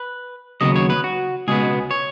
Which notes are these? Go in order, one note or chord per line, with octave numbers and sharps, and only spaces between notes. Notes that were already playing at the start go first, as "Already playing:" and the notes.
Already playing: B4
D#2 C#3 F#3 B3 D#5
C#5
B4
F#4
C#2 B2 G#3 B3 G#4
C#5